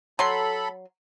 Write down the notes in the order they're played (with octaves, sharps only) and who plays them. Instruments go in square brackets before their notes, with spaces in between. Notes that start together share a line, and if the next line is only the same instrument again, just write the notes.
[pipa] F#3 C6 [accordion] A4 B5